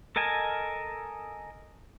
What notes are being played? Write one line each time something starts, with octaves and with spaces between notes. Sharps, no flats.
A4 A#4 D#5 G#5 A5